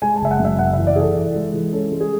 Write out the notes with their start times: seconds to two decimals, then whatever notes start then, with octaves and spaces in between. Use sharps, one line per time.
0.02 G#3 G#5
0.16 A5
0.21 F#1 E5
0.31 F#5
0.39 F#2
0.45 E5
0.59 F#1 F#5
0.73 E3 E5
0.87 D5
0.96 E3 G#4
1.01 A4
1.15 E3
1.35 G#3
1.54 E3
1.72 C#4 A4
1.92 G#3
2.01 G#4